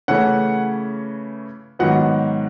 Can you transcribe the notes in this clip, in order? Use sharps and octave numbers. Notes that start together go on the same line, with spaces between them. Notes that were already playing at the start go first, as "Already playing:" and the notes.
C#3 E3 A3 C#4 F#5
G#2 D#3 F#3 B3 F#5